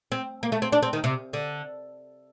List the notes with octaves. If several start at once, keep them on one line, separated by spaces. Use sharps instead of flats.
C4
A#3
A3
C4
D4
C4
D#3
C3
D3